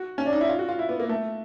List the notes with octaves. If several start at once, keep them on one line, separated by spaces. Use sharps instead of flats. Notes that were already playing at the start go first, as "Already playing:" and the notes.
Already playing: F#4
C#4
D4
D#4
E4
F4
F#4
F4
E4
B3
A#3
A3